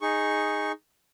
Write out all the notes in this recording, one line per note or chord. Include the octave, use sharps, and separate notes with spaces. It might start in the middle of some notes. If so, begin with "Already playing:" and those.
D#4 G#4 C#6